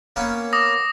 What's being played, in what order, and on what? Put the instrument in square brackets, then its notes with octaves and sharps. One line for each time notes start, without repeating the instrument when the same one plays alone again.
[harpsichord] A#3 B3 C#4
[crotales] D6 D#6 A#6